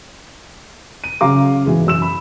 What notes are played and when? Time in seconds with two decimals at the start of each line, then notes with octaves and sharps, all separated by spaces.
1.04 D#7
1.21 C#3 F#3 F5 A#5 D6
1.66 G#2 B2 E3 G#3
1.87 F#2 E6 E7
2.02 B5